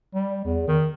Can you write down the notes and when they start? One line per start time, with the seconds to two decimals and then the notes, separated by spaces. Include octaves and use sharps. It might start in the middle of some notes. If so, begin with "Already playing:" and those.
0.14 G3
0.44 E2
0.68 D#3